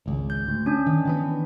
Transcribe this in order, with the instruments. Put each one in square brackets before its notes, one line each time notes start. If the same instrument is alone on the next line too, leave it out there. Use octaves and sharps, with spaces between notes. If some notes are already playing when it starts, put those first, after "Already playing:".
[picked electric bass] G#1 C#2
[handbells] G6
[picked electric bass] D2
[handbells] C#4 D4
[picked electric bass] D#3
D#3 E3 B3